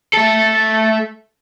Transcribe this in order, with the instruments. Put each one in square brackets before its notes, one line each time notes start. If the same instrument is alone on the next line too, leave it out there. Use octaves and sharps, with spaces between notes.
[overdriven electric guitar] A3 A4